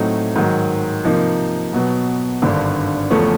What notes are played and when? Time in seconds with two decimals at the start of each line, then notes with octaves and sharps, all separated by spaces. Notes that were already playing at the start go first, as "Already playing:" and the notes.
Already playing: A2 F#3 A3 C4 D#4
0.36 G#2 D#3 F#3
1.04 C3 F3 A#3 D#4
1.73 B2 F#3 B3
2.42 G#1 G2 D3
3.11 E2 C#3 F3 A3 C#4